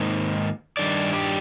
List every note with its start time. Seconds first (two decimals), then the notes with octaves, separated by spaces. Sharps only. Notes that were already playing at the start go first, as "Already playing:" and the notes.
Already playing: G#2 D#3 A#3
0.77 G2 D#3 D5
1.13 G3 G4